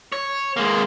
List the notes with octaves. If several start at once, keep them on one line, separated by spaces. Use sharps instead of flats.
C#5
G#3 A#3